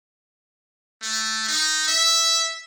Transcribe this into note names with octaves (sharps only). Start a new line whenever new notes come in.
A3
D#4
E5